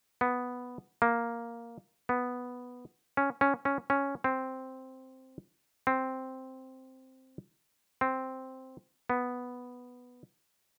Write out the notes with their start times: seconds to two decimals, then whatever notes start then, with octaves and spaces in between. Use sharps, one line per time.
0.21 B3
1.02 A#3
2.09 B3
3.17 C#4
3.41 C#4
3.65 C#4
3.90 C#4
4.24 C4
5.87 C4
8.01 C4
9.10 B3